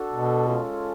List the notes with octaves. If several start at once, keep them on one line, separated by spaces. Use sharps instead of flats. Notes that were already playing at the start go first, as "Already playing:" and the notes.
Already playing: D4 F#4 A4
B2
G#3 C#4 F4 A4